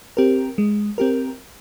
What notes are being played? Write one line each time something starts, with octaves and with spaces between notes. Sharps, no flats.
C4 G4 A#4
G#3
C4 G4 A#4